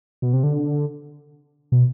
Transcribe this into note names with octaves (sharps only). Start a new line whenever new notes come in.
B2
C3
D3
B2